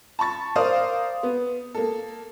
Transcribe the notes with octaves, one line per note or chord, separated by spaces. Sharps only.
A5 B5 C#6 A6
A#4 C5 D5 F5 D#6
B3
A#3 A4